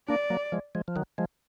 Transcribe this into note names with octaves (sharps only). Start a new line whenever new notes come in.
A#3 D4 D5
F#3 A#3
F3 G#3
F3 G#3
F3
D#3 F#3
F3 G#3